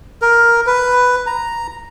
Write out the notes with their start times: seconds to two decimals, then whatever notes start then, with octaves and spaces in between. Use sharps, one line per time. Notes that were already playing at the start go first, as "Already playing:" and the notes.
0.22 A#4
0.67 B4
1.26 A#5